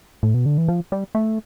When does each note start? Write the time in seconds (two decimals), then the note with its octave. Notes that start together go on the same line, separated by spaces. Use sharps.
0.23 A2
0.34 B2
0.46 D3
0.58 E3
0.68 F3
0.92 G3
1.15 A3